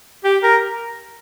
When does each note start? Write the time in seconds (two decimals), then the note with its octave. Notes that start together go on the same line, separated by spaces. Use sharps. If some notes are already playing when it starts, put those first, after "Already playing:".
0.25 G4
0.43 A#4